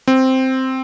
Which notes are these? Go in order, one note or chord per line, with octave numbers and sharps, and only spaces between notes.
C4